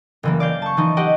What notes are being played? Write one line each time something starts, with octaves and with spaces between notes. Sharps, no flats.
F#1 E3 A#3
D5 F5 G6
A5 C#6
E3 F3 D#4
G4 D#5 F#5